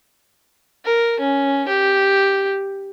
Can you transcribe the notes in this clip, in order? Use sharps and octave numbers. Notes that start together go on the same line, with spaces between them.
A#4
C#4
G4